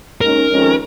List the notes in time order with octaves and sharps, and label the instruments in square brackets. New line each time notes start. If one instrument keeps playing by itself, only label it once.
[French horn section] D#2 D#3 G#3 C#4 [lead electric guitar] A#4
[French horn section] F2 D#3 G#3 C#4